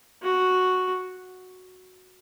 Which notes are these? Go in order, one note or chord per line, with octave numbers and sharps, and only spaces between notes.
F#4